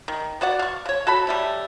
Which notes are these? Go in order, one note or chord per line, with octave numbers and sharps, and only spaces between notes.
D#3
B3 F#4 D5 F#5
F5 C#6
C#3 C#5
F#4 A4 B5
G3 A3 C#4